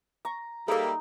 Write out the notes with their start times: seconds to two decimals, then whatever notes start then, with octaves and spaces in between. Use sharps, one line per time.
0.25 A#5 C#6
0.68 G3 A#3 D#4 G#4 A4 E5